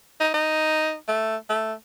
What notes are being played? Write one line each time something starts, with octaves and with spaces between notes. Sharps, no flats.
D#4
D#4
A3
A3